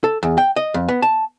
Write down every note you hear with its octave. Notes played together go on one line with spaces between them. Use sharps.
A4
E2
G5
D#5
F2
B3
A5